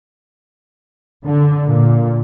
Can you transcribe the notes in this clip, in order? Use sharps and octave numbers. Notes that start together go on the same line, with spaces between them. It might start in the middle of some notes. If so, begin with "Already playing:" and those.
D3
A#2